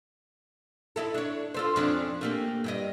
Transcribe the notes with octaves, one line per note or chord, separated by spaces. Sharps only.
D#4 E4 A4
D4 C#5
F4 A4 C5
F2 C#4 D4
A3 A#3 G4
G2 G4 D#5